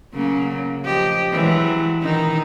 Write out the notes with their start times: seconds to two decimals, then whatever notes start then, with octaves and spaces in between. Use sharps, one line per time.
0.14 C#3 F#3 A#3
0.84 F3 G4 D#5
1.32 E3 F#3 G#3
2.03 D#3 E3 D#4